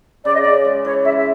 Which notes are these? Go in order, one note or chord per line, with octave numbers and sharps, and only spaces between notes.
C#3 D5
D#5
C#3 D5
G#3
E3 C#5
C#3 E5
E5